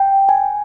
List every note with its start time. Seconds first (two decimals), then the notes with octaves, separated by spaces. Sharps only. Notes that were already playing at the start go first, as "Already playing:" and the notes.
Already playing: G5
0.29 G#5